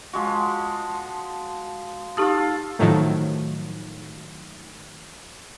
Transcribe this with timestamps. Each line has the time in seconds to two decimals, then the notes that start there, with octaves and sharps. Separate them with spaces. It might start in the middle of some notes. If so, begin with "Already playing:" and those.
0.13 F3 G#3 F#4
2.17 D#4 F4 G4 A4 D#6
2.79 A2 D#3 F3 F#3 A3